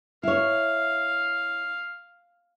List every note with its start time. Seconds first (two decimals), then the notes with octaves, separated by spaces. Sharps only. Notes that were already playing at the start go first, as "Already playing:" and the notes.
0.23 E4 C#5 F5